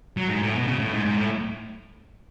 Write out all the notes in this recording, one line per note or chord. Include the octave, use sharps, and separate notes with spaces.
F#3
G#2
A2
B2
C#3
A2
G#2
G#2
A2